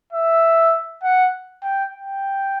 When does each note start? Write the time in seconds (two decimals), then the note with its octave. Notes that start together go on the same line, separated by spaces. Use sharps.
0.13 E5
1.03 F#5
1.63 G5
1.94 G5